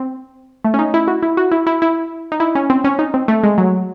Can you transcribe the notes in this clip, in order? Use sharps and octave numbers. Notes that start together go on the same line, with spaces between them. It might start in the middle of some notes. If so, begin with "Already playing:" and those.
Already playing: C4
A3
C#4
D#4
E4
F#4
E4
F#4
E4
E4
E4
D#4
E4
C#4
C4
C#4
D#4
C4
A3
G#3
F#3